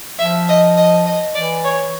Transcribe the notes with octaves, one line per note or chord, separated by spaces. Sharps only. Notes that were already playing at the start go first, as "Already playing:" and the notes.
F3 E5
D#5
D#5
D#5
E3 D5
C#5